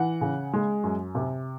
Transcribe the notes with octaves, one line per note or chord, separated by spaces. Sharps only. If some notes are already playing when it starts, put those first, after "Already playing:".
Already playing: E3 F#5
C#3
G#3
F#2
C3